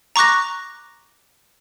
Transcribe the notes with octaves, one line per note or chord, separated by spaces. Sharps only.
A#5 C#6 D6 F#6 A#6